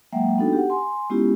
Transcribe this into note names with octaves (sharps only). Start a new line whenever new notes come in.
F#3 G#3 A#3 E5 F#5 G5
B3 D4 D#4 F#4 A4 G5
G4 F#5
G#5 C6
G#3 B3 C#4 E4 F4 G4